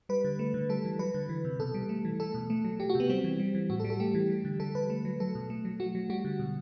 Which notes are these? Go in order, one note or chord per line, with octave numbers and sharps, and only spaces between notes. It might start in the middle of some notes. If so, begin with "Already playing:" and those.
G3 B4
D3
A3
D3
G3 A4
E3
F#3 B4
D3
E3
C3
B2 A4
G3
A3
E3
A3 A4
B2
A3
F#3
F#3 G4
F#4
C3 B3
G3 C4
E3
G3
E3
A2 F#4
A4
G3
A4
A3 G4
E3
G3
D3
G3 A4
D3 B4
A3
F#3
F#3 A4
B2
A3
F#3
A3 F#4
F#3
G3 F#4
D3
B2